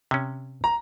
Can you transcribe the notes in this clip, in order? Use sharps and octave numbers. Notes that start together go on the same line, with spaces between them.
C3 C#4
A#5